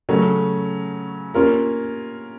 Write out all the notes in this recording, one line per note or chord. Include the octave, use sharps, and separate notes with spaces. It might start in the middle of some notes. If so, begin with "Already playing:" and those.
C#3 F#3 A3 C#4
A#3 C#4 F4 A#4